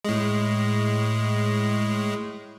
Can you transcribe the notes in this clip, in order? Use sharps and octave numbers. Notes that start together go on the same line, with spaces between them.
A2 G#3